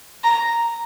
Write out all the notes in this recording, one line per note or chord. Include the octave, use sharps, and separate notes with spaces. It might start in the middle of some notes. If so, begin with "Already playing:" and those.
A#5